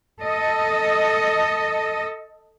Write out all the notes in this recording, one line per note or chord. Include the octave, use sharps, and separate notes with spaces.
A4 D#5